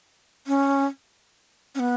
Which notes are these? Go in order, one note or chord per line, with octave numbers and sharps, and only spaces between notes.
C#4
C#4
B3